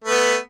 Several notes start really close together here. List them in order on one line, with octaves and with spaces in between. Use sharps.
A3 B4 B3